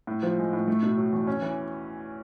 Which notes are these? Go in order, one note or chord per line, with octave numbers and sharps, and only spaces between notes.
A2
F3
G#3
A2
A3
B2
F#3
E2
C#4
E3